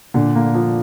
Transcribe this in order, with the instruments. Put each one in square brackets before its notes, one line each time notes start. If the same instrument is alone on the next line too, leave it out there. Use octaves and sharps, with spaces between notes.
[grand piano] A#2 [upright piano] D3
[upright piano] A#3
F3